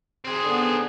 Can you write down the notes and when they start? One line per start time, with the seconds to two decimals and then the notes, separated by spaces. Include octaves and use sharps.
0.25 C4 G#4
0.44 D3 B3